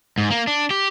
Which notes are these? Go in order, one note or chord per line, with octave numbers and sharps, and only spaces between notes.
G#2
A#3
D4
G4